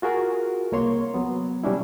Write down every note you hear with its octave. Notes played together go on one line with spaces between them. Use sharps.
F4 F#4 G#4 A#4
C2 A#3 C#5 C6
F#3 B3
B2 G3 C#4 D4 E4